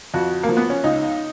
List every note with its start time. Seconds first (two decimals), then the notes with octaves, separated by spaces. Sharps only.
0.14 F2 F#4
0.43 A#3
0.49 F3
0.57 B3
0.70 C#4
0.84 C#2 D#4